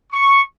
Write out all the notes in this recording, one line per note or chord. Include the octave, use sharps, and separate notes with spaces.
C#6